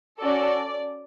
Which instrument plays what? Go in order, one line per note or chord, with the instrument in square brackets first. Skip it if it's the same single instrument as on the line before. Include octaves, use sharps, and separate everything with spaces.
[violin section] C#4 F#4 A4 D5